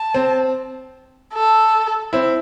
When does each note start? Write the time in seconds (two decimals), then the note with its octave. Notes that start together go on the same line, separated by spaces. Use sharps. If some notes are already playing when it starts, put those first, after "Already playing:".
Already playing: A5
0.14 C4
1.34 A4
2.13 C4 E4